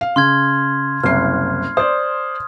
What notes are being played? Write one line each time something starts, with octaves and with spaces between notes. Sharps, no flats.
F5
C#3 C6 F6 G#6
F#1 C2 F6 C7
C5 D5 D#6